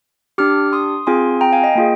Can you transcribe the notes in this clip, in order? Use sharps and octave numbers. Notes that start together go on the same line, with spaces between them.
D4 G4 D6 F6
C6 D#6
C4 F4 G#4 G#5 C6
G5 A#5
F5 G#5
D#5 G5
A#3 F4 G#4